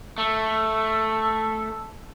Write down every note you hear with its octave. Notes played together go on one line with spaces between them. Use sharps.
A3 E6